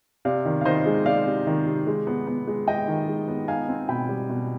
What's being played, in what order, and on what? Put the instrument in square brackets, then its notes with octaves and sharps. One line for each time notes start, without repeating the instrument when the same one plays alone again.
[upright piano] C3 D5 F5
D#3
F5
D#3 C5 D#5
G#3
G#3 D5 F5
C3
D#3
C3
G#3
B3
B3
G#3
G#3 D#5 G5
D#3
G#3
B3
D#4 F5 G#5
C4
B2 G5 B5
G3
B2